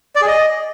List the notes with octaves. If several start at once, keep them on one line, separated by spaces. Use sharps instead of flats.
D5
G#4
D#5